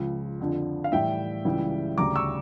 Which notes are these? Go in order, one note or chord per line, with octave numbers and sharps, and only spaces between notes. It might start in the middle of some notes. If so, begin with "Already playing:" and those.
Already playing: C#2 C#3 F3
F2 D3 F3
F5
A2 E3 G3 E5 G5
C#2 C#3 E3 G3
D2 C#3 G3 A#5 D6
C#6 E6